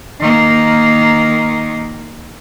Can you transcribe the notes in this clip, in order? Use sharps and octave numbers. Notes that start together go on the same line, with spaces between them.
D#3 A#3